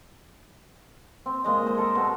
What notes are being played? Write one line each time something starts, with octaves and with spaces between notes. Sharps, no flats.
C4
A#2 G#3 D#5
G#3 C5
A4 A#4
B2 C4